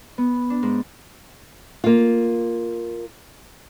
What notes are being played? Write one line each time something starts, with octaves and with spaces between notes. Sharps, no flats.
B3
D4
G#2
A#3 F4